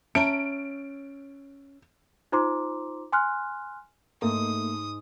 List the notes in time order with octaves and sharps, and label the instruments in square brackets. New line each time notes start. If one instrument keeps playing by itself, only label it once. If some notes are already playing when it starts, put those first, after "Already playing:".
[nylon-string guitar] C#4 [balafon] E5 A5 A#5 [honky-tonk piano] D7
[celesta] D#4 F4 C5 A#5 C6 D6
G#5 C6 F6 F#6
[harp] G#2 [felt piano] A3 [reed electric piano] A#3 [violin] D#6